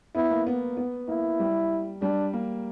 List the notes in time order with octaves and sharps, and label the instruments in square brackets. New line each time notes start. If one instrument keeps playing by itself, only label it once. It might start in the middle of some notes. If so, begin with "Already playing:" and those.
[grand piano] B3 [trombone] E4
[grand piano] A#3
B3
B3
[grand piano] A#3 [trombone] E4
[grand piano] G3
[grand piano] G3 [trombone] D4
[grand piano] A#3